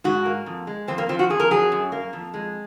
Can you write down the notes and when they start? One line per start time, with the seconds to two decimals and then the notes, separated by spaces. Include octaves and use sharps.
0.04 G#2 F#4
0.25 A#3
0.46 F2
0.67 G#3
0.88 F2 C4
0.98 A#3
1.09 F3 C4
1.19 F#4
1.30 F2 G#4
1.40 A#4
1.50 F#3 G#4
1.72 F#2
1.92 A#3
2.13 F2
2.34 G#3